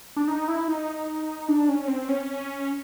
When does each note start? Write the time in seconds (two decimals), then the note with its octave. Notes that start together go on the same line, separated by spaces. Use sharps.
0.16 D4
0.28 D#4
0.48 E4
0.68 D#4
1.48 D4
1.69 C#4
1.88 C4
2.09 C#4